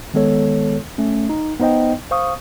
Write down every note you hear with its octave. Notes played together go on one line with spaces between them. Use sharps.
D#3 G#3 B3 A4 C#5
A3 C#4
D#4
B3 D#4 C5 D#5 G5
C5 F5 C#6 D#6